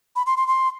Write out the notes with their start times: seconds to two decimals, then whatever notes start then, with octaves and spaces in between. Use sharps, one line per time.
0.16 B5
0.26 C6
0.37 C6
0.48 C6